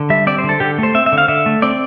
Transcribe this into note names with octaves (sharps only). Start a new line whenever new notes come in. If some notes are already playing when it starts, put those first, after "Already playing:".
Already playing: D3
G3 E5
C4 D5
C5
D3
A4
D3 G4
A3 C5
C4 E5
E5
D3
F5
D3 E5
A3
C4 D5